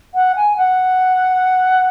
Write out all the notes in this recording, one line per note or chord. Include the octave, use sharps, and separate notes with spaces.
F#5
G#5
F#5